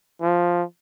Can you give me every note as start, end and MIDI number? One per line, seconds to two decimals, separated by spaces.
0.21 0.63 53